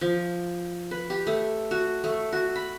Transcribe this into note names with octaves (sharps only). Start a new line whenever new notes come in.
F3
B4
G4
A3
F#4
A3
F#4
B5